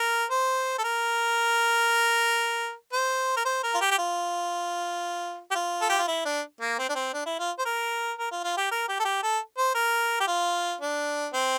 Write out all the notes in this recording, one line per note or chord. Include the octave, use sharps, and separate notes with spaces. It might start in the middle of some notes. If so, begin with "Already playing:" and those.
Already playing: A#4
C5
A4
A#4
C5
A#4
C5
A#4
F4
G4
G4
F4
G4
F4
A4
G4
F4
E4
D4
A#3
C4
D4
C4
D4
E4
F4
C5
A#4
A#4
F4
F4
G4
A#4
G4
A4
G4
A4
C5
A#4
G4
F4
D4
C4